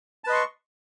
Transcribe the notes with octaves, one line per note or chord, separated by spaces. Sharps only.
B4 D#5 A5 C6 C#6